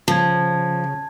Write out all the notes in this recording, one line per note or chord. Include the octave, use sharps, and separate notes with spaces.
C#3 F3 A5 G#6